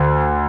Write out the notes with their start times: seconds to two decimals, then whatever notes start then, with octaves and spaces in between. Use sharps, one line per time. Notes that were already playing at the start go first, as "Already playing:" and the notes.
Already playing: D2